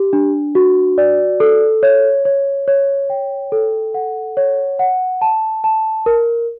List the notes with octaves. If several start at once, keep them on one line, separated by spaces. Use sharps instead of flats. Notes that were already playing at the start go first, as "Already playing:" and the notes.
Already playing: G4
D4
F#4
D5
A4
C#5
C#5
C#5
G5
A4
F#5
C#5
F#5
A5
A5
A#4